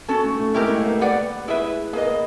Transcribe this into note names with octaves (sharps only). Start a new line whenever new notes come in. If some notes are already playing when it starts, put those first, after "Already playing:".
C#4 F#4 A4
A3
A3
G#3 E4 G4 A#4
A3
A#3
B3
G4 B4 D5 F#5
E4 G#4 B4 E5
A#3 G#4 B4 D#5
B3